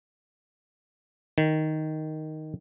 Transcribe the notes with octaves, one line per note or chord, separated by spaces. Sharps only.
D#3